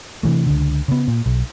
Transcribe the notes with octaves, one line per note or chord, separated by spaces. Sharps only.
C3 E3 A3
C#2 D3
C#3 B3
A#2
B1